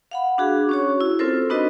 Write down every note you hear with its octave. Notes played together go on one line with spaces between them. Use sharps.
F5 F#5 B5
D4 F#4 G#4
C#4 F#4 C#5
E4
C4 F4 A4 A#4 C5
B3 D4 D#4 F#4 B4 D#5